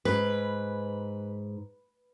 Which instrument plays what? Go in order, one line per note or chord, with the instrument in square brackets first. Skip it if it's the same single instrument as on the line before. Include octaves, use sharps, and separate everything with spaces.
[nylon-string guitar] G#2 [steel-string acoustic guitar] B4